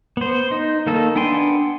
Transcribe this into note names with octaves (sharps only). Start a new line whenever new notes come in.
B3 C5
D#4
D#3 A#3 D#4 A4
B3 D4 G5 G#5 C6